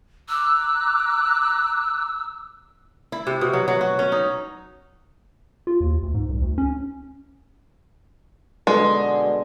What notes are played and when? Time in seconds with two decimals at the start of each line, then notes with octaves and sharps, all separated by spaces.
0.29 A#5 D6 E6 F#6
3.12 E4
3.27 C3
3.41 B2
3.53 F#3
3.68 F#3
3.81 F#4
3.99 C#4
4.12 D#4
5.67 F4
5.81 D#2
6.03 D2
6.14 G#2
6.29 C2
6.42 D2
6.58 C#4
8.67 B2 D3 G#3